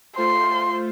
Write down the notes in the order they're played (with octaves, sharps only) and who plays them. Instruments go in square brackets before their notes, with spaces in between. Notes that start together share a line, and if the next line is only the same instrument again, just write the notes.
[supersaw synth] A3 F4 C5 [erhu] C6